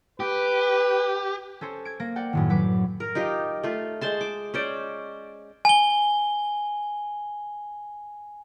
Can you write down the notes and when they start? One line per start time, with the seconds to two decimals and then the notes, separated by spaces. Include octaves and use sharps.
0.20 G4 B4
1.61 C#4 A4 C5 C#5
1.85 G#6 D7
2.00 A#3 A#6 D7
2.16 D5 F#5 G5
2.33 F#2 A2 D#3
2.49 F#3 B4 D6
3.00 A#4
3.15 D#4 F4 G4
3.63 A3 F4
4.01 G#3 C5 A5 C6
4.21 D6
4.54 C#4 C5 D5
5.65 G#5 G7